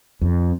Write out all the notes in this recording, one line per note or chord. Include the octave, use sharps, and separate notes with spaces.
F2